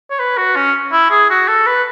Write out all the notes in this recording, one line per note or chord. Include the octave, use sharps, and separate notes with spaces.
C#5
B4
F#4
C#4
E4
G#4
F#4
A4
B4